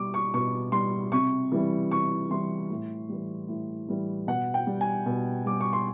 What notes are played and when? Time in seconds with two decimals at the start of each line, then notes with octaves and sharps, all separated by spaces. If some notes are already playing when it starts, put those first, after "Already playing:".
Already playing: B2 G3 C#6 D6
0.14 C#6
0.34 B2 C#6
0.72 G3 C6
1.12 C3 C#6
1.52 E3 G3
1.91 C3 C#6
2.30 E3 G3 C6
2.70 A2
3.09 E3 G3
3.48 A2
3.89 E3 G3
4.27 B2 F#5
4.54 G5
4.67 G3
4.81 G#5
5.06 B2
5.46 G3 D6
5.61 C#6
5.73 C6